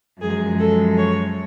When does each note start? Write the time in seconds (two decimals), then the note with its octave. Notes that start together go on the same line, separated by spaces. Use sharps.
0.20 F#2 F3 G#3 G#4
0.59 A4
0.97 C#5